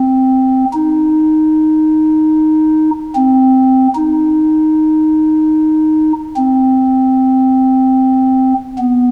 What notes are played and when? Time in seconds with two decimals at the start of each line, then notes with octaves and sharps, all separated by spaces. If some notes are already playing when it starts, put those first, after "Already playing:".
Already playing: C4
0.73 D#4
3.15 C4
3.95 D#4
6.36 C4
8.78 B3